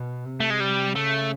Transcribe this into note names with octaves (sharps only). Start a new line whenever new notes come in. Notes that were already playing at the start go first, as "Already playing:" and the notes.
Already playing: B2
C3
A3
G#3
G3
C#3 A3